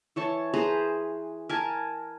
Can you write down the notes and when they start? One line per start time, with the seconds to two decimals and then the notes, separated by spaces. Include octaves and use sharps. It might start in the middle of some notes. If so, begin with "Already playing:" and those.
0.16 E3 C#5 A5
0.54 G#4 B4 C5 A#5
1.49 A#4 G#5 A5